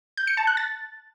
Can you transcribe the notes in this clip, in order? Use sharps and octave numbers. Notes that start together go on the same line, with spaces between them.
G6
C#7
A5
F#6
A6